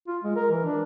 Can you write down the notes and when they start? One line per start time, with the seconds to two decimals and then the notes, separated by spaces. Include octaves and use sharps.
0.08 F4
0.24 G#3
0.36 A#4
0.51 E3
0.65 D4